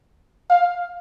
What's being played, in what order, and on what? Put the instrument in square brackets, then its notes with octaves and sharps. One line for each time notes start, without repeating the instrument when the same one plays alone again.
[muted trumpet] F5